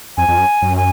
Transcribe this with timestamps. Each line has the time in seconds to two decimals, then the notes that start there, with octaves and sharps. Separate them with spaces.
0.17 F2 G#5
0.28 F2
0.38 F#2
0.62 F#2
0.77 G#5